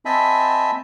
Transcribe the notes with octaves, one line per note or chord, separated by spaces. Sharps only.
C4 D#5 E5 G#5 A5 B5